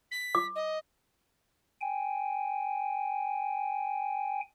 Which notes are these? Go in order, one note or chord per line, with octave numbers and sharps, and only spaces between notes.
B6
D6
D#5
G5 G#5